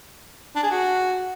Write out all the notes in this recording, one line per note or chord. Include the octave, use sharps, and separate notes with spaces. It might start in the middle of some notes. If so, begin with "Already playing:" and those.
D4
G#4
F#4